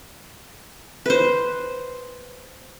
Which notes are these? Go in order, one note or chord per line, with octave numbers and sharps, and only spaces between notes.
B4 C5